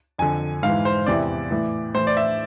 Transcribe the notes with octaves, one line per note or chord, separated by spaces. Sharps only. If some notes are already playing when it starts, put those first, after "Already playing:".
F2 D3 G#5
G#2 E3 F5
C5
E2 C3 E3 D5
A2 E3
A2 E3 C5
D5
E5